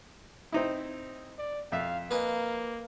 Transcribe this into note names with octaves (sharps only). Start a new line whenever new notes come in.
C4 D#4 E4
D5
F2 E5 F5
A#3 B4 D#5 G#5